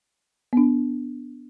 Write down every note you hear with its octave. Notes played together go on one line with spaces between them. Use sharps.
B3 D4